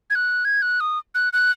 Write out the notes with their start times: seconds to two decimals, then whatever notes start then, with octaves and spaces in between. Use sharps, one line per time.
0.10 G#6
0.15 F#6
0.45 G#6
0.62 F#6
0.80 D#6
1.15 F#6
1.33 F#6